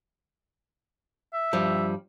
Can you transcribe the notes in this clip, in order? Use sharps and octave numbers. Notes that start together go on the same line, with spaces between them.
E5
G2 F3 G3